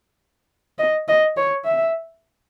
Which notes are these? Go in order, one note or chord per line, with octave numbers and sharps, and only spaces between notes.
D#5
D#5
C#5
E5